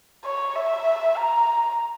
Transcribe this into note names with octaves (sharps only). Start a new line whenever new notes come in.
C#5
E5
A#5